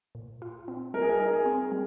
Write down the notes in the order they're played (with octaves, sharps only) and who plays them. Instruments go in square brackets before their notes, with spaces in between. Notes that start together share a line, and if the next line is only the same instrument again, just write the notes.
[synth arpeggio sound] A#2
F4
C4
[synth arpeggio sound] G3 [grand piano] A#4
[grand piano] G#4
A#4
[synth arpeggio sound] D#4
[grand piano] G#4
[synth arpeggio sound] C4
G3